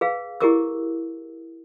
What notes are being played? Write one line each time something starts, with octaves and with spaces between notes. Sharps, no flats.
G#4 B4 F5
E4 G4 G#4 A#4 D6 E6